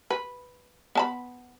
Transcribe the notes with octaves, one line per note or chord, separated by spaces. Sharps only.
B4
B3 A5 B5